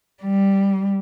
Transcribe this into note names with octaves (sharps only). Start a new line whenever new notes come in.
G3